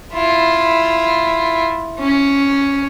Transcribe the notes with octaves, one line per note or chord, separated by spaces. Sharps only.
E4 F4
C#4